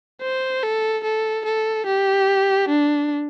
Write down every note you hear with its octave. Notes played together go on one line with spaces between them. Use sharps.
C5
A4
A4
A4
G4
D4